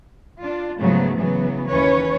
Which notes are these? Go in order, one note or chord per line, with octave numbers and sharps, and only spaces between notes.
D4 F4
G#2 C#3 F3 F#3 A3 B3
C#3 E3 F#3 B3
D#2 E3 C#4 B4 C#5